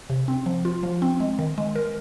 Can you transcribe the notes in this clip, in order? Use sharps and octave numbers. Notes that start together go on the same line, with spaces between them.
C3
C4
F3
F4
F3
C4
G#3
D#3
G#3
A#4